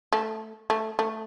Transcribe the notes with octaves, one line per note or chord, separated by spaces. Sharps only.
A3
A3
A3